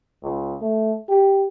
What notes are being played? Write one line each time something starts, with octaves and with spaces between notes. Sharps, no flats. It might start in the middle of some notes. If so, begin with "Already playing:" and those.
C#2
A3
G4